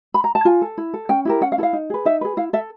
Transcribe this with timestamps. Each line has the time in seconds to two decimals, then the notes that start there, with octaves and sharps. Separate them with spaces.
0.14 B5
0.24 A#5
0.35 A5
0.45 F4 G#5
0.62 A4
0.78 E4
0.94 A4
1.09 C#4 G5
1.25 E4 G4 A#4
1.41 C#4 F#5
1.52 F5
1.58 E4 A4
1.63 F5
1.73 D#4
1.90 G#4 B4
2.05 D#4 E5
2.21 G#4 B4
2.37 E4 F5
2.53 A4 E5